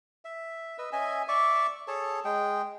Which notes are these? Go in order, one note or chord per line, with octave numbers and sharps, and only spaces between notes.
E5
B4 D#5 E6
C#4 D#5 E5 G#5
D5 E5 C#6 D6
G#4 A4 C#5 A5
G#3 G#4 G5